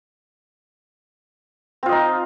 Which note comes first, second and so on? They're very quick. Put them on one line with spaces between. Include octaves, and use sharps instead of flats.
C4 F4 D#5 D#4